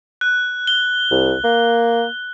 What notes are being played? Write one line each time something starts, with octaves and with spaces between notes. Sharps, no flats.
F#6
G7
C2
A#3